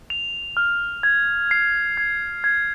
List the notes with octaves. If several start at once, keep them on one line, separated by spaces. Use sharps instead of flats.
F7
F6
G#6
C7
G#6
G#6